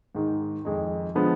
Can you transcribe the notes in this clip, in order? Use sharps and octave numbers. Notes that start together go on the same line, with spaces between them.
G#2 D#3 G#3
F2 D#3 G#3 D#4
D3 F3 G#3 B3